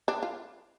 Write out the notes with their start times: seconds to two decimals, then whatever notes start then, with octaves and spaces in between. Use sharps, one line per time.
0.08 D4
0.23 F4